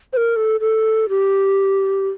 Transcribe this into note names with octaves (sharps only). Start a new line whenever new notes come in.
C5
A#4
A4
A4
G4